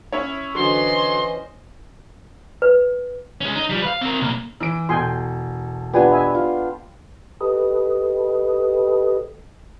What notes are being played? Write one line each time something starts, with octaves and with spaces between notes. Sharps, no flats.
C#4 E4 C#5
D3 E3 F#3 C#4 C5 D#5 C6
B4
G#3 C#4
D#4
F3 G3
B4 F5
C4 A#4
B1 A#3
E3 D7
E1 A4 G5 G#5 C6
B3 D4 F4 G4 B4 G#5
D#5 E5 G#5
F4
G4 A4 B4 D#5